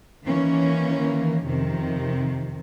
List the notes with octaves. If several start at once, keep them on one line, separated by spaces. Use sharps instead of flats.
D#3 E3 A#3 C#4
F2 C3 D#3